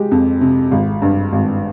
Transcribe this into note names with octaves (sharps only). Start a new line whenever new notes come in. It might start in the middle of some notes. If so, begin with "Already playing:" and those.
Already playing: G#3 G4
F2
C3
G#1
G2
G#1